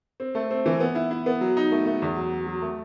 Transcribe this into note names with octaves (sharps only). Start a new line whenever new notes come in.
C4
A3
C4
E3
B3
E4
E4
B3
F#3
D#4
A3
A3
E2
F#3
F#3
F#3
A3